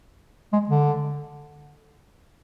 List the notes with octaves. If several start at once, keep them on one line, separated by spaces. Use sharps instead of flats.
G#3
D3